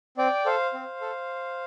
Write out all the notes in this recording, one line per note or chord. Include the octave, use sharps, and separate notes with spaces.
C4 D5 G5
A4 C5 F5
C4
A4